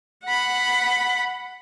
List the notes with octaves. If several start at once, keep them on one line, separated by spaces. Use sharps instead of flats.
F#5 B5